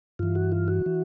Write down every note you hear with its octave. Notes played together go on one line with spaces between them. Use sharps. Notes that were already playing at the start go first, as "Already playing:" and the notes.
G2 E3 F4
F#4
F4
F#4
E3